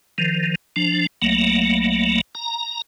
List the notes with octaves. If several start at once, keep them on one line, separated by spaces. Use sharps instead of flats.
D#3 F3
F3 D4
B1 F#3 A3 A#3
A#5